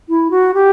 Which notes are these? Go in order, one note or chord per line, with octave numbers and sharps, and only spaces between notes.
E4
F#4
G4